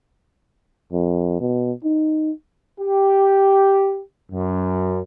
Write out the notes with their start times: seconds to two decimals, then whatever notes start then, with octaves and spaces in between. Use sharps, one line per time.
0.93 F2
1.40 B2
1.84 D#4
2.81 G4
4.32 F#2